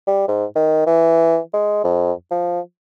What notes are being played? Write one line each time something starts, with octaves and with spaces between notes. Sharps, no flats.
G3
G#2
D#3
E3
G#3
F2
F3